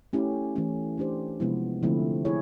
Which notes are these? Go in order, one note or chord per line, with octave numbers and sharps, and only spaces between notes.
A3 C#4 E4 G4
E3 A3 C#4
A3 D4 G4 C5
C3 F3 G#3 B3 E4
D3 F3 A3 C4 E4
E4 G#4 C#5